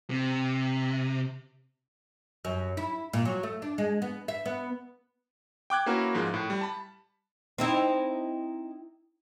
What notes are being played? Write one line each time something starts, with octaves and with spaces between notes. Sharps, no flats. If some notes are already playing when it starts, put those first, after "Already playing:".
C3
F#2
E4
A#2
F#3
A3
D4
G#3
B3
E5
B3
G5 D6 F#6 G#6
A#3 C#4 E4 F#4 A#4 B4
G#2 F3 G#3
A2
G3
A5 B5
C4 D#4 E4